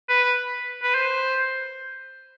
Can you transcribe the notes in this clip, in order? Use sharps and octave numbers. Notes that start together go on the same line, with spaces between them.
B4
B4
C5